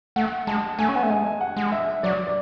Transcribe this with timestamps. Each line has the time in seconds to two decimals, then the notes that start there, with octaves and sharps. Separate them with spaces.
0.16 A3 F#5
0.47 G#3 A5
0.79 A3 G#5
0.89 C#4
0.96 B3
1.03 A3
1.10 G#3 G#5
1.41 F#5
1.57 G#3
1.72 E5
2.03 F#3 D5
2.27 D5